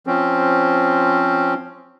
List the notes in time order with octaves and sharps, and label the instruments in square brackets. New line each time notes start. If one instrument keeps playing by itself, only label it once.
[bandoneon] F3 C4 C#4